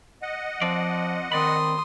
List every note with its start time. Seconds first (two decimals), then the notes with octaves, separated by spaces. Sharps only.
0.22 D#5 F#5
0.62 F3 C4 F4 D5
1.32 D#3 C4 D5 B5 C6 D#6